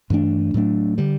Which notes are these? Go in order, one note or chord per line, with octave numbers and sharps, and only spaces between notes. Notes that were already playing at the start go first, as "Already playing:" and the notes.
G2 E3 A3 D4
A2 F#3 A3 D4
D3 G3